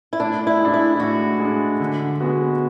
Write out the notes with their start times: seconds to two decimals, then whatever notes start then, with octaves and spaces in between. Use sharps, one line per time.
0.13 E4
0.20 A2 D4
0.47 E4
0.60 G#3 D4
0.74 E4
1.00 A2 F#4
1.40 G#3 D4
1.80 D3
2.21 G#3 B3 F#4